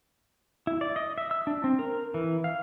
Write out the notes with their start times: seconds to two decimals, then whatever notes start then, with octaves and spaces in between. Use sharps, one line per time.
0.67 E4
0.81 D5
0.96 D#5
1.18 E5
1.31 E6
1.47 D4
1.64 C4
1.79 A#4
2.14 E3
2.44 F5